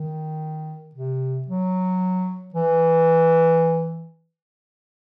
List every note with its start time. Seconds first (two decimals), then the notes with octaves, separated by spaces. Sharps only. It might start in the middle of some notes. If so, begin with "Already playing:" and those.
Already playing: D#3
0.95 C3
1.48 F#3
2.54 E3